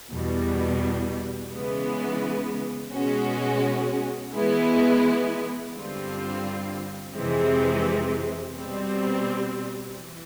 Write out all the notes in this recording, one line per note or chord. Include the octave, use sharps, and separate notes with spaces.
E2 B2 G3
C#3 E3 G#3 B3
B2 G#3 C#4 F#4
E3 G#3 B3 E4
G2 D3 G3 C4 F4
F2 C3 E3 G#3 C4
B2 G3 C4
E3